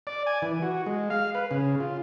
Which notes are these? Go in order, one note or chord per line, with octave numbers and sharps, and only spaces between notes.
D5
G#5
E3
F#4
G#3
F5
B4
C#3
F4